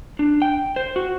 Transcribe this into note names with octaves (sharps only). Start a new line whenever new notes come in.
D4
G5
C5
F#4